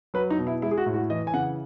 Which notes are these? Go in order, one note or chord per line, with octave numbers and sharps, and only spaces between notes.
F#3 B4
D#4
B2
E4
G#3 E4
G#4
F#4
A2
F#4
E3 D#5
G#5
C#3 F#5